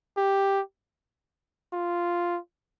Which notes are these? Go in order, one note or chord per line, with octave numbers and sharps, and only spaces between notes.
G4
F4